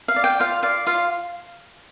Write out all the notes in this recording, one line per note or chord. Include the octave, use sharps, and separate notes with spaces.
F5
D5
G5
F4 F5
D5 F5
F4 F5